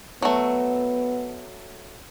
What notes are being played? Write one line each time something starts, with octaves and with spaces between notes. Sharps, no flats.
F#3 A3 B3